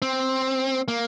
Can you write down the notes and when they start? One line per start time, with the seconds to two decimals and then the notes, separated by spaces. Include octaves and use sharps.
0.02 C4
0.88 A#3